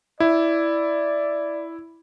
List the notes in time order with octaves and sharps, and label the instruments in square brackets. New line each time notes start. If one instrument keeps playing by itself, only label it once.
[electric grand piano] E4 [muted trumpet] D5